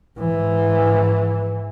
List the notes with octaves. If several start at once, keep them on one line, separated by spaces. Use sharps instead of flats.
G#2 E3